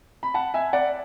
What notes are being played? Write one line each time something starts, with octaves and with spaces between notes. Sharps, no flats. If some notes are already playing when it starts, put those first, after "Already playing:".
B5
F#5 A5
E5 G#5
D5 F#5